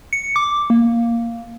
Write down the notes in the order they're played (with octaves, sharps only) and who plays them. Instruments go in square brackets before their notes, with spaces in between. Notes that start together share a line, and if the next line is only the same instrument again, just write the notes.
[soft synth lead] C#7
D6
A#3